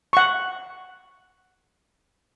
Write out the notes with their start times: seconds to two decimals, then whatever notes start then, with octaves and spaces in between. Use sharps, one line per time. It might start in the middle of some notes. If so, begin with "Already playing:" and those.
0.13 F#5 C#6